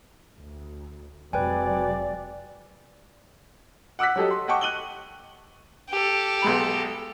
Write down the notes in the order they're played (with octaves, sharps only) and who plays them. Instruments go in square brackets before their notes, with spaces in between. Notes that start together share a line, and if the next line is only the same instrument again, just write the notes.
[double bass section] D2
[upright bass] F1 [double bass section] C3 F#3 G#3 [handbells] B4 G5 G#5 [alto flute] D5
[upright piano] F#5 D6 E6 F#6 B6
F#3 G3 G4 A4 D#5
C6
D#5 F#5 G5 A5 C#6 D6
F#6 D#7 F#7 G7
[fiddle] G4 A4
[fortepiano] B1 G#3 B5